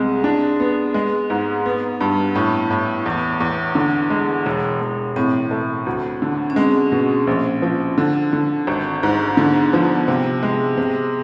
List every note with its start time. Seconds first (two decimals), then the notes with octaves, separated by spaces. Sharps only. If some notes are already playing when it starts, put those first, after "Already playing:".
Already playing: C2 G#3 C4
0.24 D4
0.60 B3
0.94 G#3
1.30 G#2
1.66 B3
2.00 G2
2.35 A2 B3
2.71 A2
3.06 E2
3.40 E2
3.75 D3
4.10 G#3
4.46 E1
4.81 E1
5.16 A2 C4
5.51 A3
5.86 D2
6.22 D3
6.50 C#4
6.56 G#3 C4
6.92 B2
7.27 A#1
7.62 F3
7.98 D3
8.33 D3
8.67 G#1
9.03 G#2
9.37 D3 B3
9.73 F3
9.95 B3
10.08 C3 C4
10.43 G#3
10.77 C3